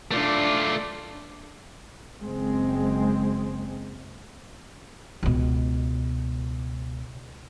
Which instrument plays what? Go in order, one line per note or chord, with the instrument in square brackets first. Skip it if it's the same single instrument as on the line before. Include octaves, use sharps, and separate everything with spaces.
[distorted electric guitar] A3 F4 [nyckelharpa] D4 D5
[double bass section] F#1 G#3 C4
[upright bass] C#2 B2